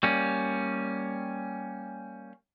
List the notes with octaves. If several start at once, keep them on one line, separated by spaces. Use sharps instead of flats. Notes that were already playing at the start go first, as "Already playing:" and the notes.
G3 A#3 C#4